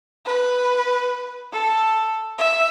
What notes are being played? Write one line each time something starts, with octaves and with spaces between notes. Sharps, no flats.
B4
A4
E5